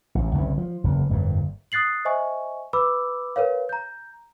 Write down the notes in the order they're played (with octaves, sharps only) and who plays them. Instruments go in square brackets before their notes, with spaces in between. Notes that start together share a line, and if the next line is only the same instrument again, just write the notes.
[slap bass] A1
G1 C2 G2 C#3
F3
F#1 E2
G1 F2 A#2
[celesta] D#6 F#6 A6 C7 F#7
C5 D#5 E5 G#5 C#6
B4 B5 D6 E6
A#4 B4 C#5 F5
A#5 G6